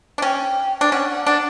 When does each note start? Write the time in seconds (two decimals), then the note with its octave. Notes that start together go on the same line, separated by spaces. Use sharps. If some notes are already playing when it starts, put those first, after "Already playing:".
0.18 D4
0.22 C#4 G5
0.81 D4
0.92 C#4 F#5
1.09 F#5
1.27 D4 F#5